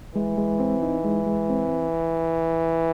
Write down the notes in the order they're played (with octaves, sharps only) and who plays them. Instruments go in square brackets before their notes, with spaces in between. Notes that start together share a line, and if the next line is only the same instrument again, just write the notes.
[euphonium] E3 [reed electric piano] G#3
[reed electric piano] G#3
C4
D#4
G#3
G#3
C4